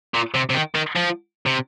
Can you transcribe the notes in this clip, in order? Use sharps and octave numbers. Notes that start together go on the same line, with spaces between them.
A#2
C3
C3
D#3
D#3
F3
C3